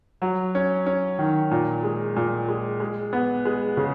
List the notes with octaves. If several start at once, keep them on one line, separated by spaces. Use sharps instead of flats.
F#3
C#4
C#4
D#3
A#2
G#3
A#2
G#3
G#3
B3
G#3
C#3